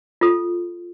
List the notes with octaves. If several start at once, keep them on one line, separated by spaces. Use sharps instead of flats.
F4 A4